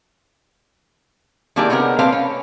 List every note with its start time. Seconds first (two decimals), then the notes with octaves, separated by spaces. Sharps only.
1.56 D#3 A#3 D4 E4 G4 G#4
1.70 C3 G#3 B3 C#4 G4 A#4
1.99 A#3 C4 B4 F5 A5
2.12 C#4